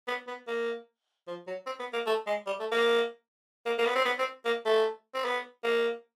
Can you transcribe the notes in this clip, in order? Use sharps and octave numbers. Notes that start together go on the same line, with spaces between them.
B3
B3
A#3
F3
F#3
C4
B3
A#3
A3
G#3
G3
A3
A#3
A#3
A#3
B3
C4
B3
C4
A#3
A3
C4
B3
A#3